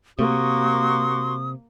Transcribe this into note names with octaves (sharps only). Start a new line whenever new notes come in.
C3 A#3 F#4 C6 C#6 D#6